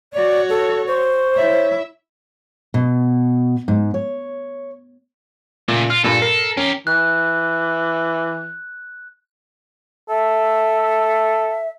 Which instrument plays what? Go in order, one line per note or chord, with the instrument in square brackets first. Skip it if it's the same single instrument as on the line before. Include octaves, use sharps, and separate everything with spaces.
[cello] F#4 C#5 [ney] D5
[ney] A4
[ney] C5 [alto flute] C#6
[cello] E4 E5 [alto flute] C#5
[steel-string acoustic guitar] B2
G#2
C#5
[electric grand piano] A#2 [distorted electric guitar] C#3 A3
[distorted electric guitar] F4 [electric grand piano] F6
[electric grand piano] G2 A#2 [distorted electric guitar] A4
[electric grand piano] A#4 C7
[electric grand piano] C#4 [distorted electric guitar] G4 A#4
[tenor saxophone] E3 [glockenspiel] F#6
[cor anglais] A4 [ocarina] E5